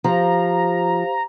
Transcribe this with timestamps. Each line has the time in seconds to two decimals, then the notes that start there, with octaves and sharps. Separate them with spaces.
0.04 F3 G4 C5 F5 A#5